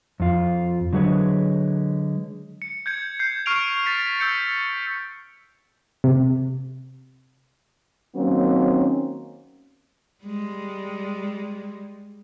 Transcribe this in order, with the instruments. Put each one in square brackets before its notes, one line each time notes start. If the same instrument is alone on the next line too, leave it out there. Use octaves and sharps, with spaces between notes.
[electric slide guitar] F2 F4
D3 F#3 G#3 B4 C#5
[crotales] C#7
G6 G#6 C#7
G6 C7
C#6 F6 C7 D7 F7
A6 B6
E6 G6 C#7
[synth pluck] C3
[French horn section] D#3 F#3 A#3 C4 C#4
[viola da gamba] G3 G#3